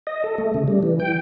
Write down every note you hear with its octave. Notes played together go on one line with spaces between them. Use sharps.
D#5
A4
A3
C#3
G3
E3
G5